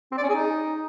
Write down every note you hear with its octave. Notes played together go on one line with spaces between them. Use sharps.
C4
D5
C#4
G#4
D#4